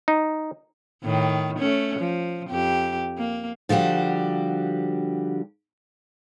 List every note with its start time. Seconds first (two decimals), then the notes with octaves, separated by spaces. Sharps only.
0.08 D#4
1.04 A2 D#3
1.59 A3 C#4
1.99 F3
2.50 F2 G4
3.18 A#3
3.69 D3 F3 G3 F#4 G4